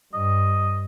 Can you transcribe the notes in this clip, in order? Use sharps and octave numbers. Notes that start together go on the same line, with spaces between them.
G2 D#5